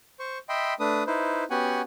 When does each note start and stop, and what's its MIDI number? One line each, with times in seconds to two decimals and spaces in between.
0.19 0.38 72
0.19 0.38 85
0.49 0.74 75
0.49 0.74 76
0.49 0.74 79
0.49 0.74 83
0.49 0.74 84
0.80 1.04 57
0.80 1.04 62
0.80 1.04 71
0.80 1.04 87
1.07 1.44 63
1.07 1.44 64
1.07 1.44 71
1.07 1.44 72
1.50 1.82 59
1.50 1.82 61
1.50 1.82 66
1.50 1.82 67
1.50 1.82 78
1.50 1.82 80